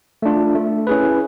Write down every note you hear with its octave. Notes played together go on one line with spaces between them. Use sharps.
A3 D4 F4
A3
C#4 E4 G#4 B4